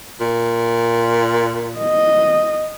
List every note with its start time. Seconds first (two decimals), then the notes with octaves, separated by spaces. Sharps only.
0.20 A#2
1.78 D#5